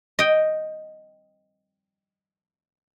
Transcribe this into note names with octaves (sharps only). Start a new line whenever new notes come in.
D#5 G5